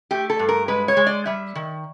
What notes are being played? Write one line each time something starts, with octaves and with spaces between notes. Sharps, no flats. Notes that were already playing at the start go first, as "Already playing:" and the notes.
A3 G4
A4
G2
A#4
G#3 B4
C#5
G#3
D5
G3 E5
D#3